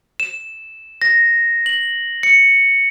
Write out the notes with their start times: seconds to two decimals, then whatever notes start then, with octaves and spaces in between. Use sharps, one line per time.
0.20 E7
1.02 A#6
1.66 F#7
2.23 C#7